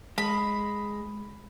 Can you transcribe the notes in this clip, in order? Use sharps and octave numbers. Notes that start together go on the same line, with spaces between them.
G#3 B5